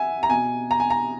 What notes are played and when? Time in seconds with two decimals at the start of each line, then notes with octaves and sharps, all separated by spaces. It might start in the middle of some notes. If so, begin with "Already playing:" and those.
Already playing: E5 F#5 G#5
0.23 A#5
0.30 B2 G#5
0.71 A#5
0.80 G#5
0.90 A#5